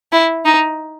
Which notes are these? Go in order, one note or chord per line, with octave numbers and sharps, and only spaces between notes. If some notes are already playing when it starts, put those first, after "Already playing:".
E4
D#4